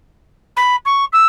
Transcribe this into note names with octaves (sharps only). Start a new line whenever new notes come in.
B5
C#6
E6